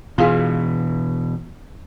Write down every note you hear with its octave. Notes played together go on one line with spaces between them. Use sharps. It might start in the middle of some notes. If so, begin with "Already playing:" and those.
B2 E3 F4 G#4